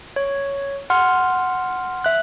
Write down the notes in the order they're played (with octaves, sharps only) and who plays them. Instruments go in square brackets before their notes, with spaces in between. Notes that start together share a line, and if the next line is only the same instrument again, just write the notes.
[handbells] C#5
F#5 C6 F6
E5 F#6